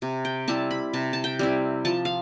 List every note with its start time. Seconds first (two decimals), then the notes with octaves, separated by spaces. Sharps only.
0.02 C3
0.25 G5
0.48 G3 C4 E4 A5
0.71 B5
0.93 C3 A5
1.13 A5
1.24 G5
1.39 G3 C4 E4
1.85 F3 A5
2.05 F5